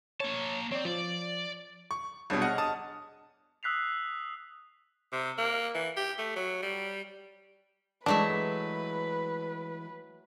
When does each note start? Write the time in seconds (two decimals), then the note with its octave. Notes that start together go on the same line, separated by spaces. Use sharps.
0.20 A#3 C#5 A5 C#6
0.72 C4 C#5 D5
0.85 F3 D5
1.91 C#6
2.30 C2 B2 D4 G#4 C#5
2.42 D#5 F#5 F6
2.58 A5 D#6
3.63 D#6 E6 F#6 B6 C7 F7
5.12 C3
5.38 A#3
5.74 E3
5.97 G4
6.19 A3
6.36 F#3
6.62 G3
8.06 E3 F#3 G#3 A3 D4 B4 E5